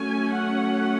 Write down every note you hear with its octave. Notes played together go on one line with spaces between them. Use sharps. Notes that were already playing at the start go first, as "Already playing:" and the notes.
Already playing: F#3 A3 C#4 G#5
F#5